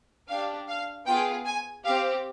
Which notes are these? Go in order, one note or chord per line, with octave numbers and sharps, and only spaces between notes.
D4 G4 F5
F5
B3 F4 G#4 G5
G#5
C4 G4 F5